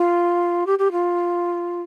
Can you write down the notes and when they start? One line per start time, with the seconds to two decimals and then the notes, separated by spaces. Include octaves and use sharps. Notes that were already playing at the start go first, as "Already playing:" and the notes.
Already playing: F4
0.66 G4
0.78 G4
0.91 F4